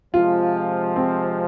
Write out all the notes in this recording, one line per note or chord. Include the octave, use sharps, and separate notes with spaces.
C3 F3 G#3 F4
C4